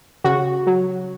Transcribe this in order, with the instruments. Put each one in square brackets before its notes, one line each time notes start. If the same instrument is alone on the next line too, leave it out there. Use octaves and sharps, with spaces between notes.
[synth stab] C#3 F#4
F#3